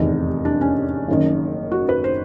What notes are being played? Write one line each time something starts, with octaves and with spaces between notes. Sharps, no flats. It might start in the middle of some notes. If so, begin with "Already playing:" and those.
Already playing: F1 E2 C3 D#3 D#4
D4
C#4
F#1 F#2 D#3
F#4
B4
C5